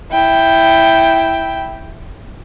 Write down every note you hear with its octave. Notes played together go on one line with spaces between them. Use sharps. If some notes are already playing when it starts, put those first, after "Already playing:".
E4 G5